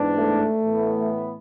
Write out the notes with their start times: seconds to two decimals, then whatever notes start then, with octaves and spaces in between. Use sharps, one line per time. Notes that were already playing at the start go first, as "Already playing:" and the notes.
Already playing: G#2 E3 B3 D4
0.18 A3
0.63 A2 E3 B3